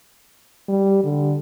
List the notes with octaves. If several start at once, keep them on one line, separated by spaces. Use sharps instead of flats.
G3
D3